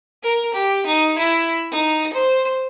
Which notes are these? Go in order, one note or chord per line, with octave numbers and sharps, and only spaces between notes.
A#4
G4
D#4
E4
D#4
C5